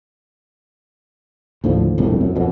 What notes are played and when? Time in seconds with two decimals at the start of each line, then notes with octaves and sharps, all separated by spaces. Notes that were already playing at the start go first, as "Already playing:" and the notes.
1.64 D#2 A2 D3 F3
1.98 E1 C2 F2 A2
2.21 F#2
2.36 F2 B2